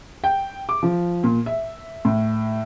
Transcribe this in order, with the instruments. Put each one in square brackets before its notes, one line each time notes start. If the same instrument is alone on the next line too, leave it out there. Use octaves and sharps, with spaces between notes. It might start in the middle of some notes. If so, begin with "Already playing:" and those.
[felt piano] G5
D6
F3
A#2
E5
A2